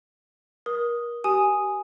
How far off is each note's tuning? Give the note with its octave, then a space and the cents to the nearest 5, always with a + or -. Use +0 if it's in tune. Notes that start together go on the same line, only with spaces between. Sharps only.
A#4 +30 D#6 +0
G4 -25 G#5 +0 D#6 +0